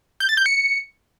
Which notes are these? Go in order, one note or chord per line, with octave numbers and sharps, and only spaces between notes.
G6
A6
G6
C#7